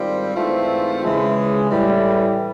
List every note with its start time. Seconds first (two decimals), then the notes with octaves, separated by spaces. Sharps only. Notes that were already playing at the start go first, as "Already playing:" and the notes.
Already playing: G#2 D#3 G3 C4 F4
0.36 G#2 E3 A3 C4 F4
1.03 C#3 E3 G#3
1.70 A2 E3 G3